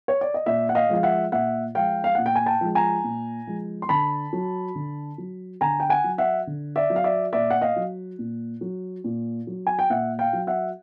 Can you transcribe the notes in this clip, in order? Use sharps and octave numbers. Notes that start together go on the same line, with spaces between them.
C#5
D5
D#5
A#2 D5 E5
F#5
D#5 F5
F3 G#3 F5
E5 F#5
A#2 E5 F#5
F3 G#3 F5 G5
F5
A#2 F#5
G5
G#5
G5 A5
F3 G#3
G#5 A#5
A#2
F3 G#3
C6
D3 A5 B5
F#3
D3
F#3
D3 G#5 A#5
G5
F#5 G#5
F#3
E5 F#5
D3
D5 E5
F#3
F5
D5 E5
A#2 D5 E5
F#5
D#5 F5
F#3
A#2
F#3
A#2
F#3
G#5
G5
A#2 E5 F#5
F5 G5
F#3
E5 F#5